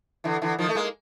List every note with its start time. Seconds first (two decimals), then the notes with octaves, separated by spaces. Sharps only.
0.24 D3 E3
0.42 D3 E3
0.59 D#3 F3
0.69 A3
0.75 G#3 A#3